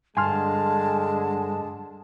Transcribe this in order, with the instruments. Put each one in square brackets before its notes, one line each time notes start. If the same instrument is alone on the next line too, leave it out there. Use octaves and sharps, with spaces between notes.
[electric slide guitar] G2 [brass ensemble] D3 G#3 [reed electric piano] G#5 C6 F6 [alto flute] A5